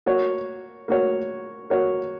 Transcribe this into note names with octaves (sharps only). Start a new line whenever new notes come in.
A#3 F#4 C#5
A#3 F#4 C#5
A#3 F#4 C#5